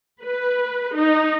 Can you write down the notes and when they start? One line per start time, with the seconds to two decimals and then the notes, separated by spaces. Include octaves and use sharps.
0.23 B4
0.96 D#4